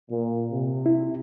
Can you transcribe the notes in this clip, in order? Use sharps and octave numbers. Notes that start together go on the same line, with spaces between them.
A#2
C3
E4